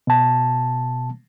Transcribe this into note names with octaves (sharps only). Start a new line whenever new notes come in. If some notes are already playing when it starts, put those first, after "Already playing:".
B2 A5